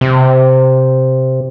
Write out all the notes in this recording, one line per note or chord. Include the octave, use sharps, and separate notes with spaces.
C3